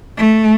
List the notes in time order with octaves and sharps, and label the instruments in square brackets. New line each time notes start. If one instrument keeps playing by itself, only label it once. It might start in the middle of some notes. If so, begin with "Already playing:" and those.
[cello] A3